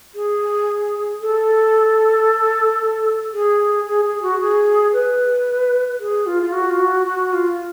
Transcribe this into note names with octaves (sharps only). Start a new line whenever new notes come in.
G#4
A4
G#4
G#4
G#4
F#4
G#4
B4
G#4
F4
F4
F#4
F4
F#4
F#4
F4